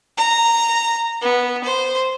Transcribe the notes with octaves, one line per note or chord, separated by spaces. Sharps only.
A#5
B3
C5